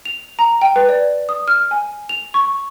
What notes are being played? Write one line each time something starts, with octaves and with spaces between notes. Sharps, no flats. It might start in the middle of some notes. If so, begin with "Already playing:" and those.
F7
A#5
G5
B4
D5
D#6
F6
G#5
F7
C#6